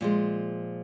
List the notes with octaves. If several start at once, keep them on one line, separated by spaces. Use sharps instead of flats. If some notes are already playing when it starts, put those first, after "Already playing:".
A#2 F3 G#3